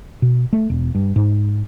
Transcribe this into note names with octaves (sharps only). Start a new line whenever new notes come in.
B2
A3
E1
G2
G#2